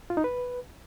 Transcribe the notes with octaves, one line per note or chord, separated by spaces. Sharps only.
F4
D#4
B4